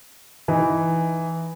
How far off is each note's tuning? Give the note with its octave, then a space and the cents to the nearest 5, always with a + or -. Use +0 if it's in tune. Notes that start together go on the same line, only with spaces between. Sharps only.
E3 +0 D#4 +5